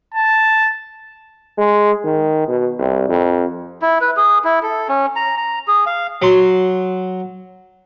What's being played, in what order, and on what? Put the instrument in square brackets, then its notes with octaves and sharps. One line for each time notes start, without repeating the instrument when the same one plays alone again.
[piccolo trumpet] A5
[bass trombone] G#3
D#3
B2
C2
F2
[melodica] E4
B4
G#4
E4
A4
C#4
A#5
A#5
G#4
F5
[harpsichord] F#3 C6